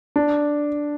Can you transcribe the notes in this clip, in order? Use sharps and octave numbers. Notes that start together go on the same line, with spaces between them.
D4